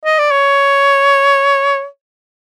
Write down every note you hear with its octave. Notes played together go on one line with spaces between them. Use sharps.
D#5
D5
C#5